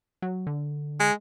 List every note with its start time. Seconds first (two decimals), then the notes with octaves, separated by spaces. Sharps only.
0.22 F#3
0.47 D3
1.00 G#3